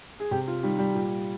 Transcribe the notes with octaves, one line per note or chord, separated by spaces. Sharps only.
G#4
C3 G4
F4
D#3 G3
G3
A#2